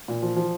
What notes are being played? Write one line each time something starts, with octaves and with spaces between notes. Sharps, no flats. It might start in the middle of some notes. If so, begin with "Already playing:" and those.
A#2
F3
F3